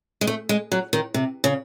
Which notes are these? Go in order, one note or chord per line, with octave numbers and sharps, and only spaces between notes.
G#3
A3
G#3
F#3
D#3
C3
C#3